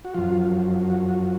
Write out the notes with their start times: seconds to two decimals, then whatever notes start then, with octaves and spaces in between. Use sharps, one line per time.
0.05 F#4
0.14 F#2 F3 F4
0.90 F#4
1.09 F#4